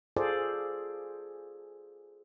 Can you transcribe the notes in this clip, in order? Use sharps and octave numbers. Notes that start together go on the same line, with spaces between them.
F4 G#4 A4 C5 D5